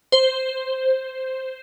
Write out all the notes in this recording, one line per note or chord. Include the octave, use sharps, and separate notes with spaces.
C5